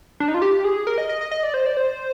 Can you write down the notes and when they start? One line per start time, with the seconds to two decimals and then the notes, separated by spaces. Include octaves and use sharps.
0.20 D4
0.28 D#4
0.34 F4
0.42 G4
0.64 G#4
0.87 A#4
0.98 D#5
1.09 D#5
1.21 D#5
1.31 D#5
1.43 D5
1.54 C5
1.66 D5
1.77 C5